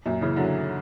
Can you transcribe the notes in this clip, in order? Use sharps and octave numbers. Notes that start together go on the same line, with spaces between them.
F#2 A#2
C#3 E3
D3 F#3